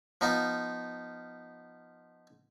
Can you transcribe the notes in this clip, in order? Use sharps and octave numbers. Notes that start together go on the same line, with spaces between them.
F3 B3 D#4 F4